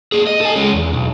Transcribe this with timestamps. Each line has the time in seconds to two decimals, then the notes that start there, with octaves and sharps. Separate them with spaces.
0.12 A#3 G#4
0.27 D#5
0.41 A4 G#5
0.56 G#3 C#4
0.72 E2
0.93 B1